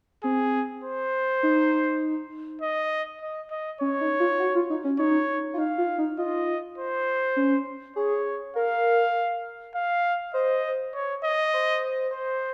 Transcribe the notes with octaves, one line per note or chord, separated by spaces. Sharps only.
C4 G#4
C5
D#4
D#5
D#5
D#5
C#4 C#5
D#4
F4
F#4
F4
D#4
C#4
D#4 C#5
F4
D#4 F5
F4
D#4
F4 D#5
C5
C#4
G#4 C#5
A#4 F5
F5
C5 D#5
C#5
D#5
C5
C5